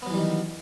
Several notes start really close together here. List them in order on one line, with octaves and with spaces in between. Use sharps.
B3 F#3 E3 G3 D#3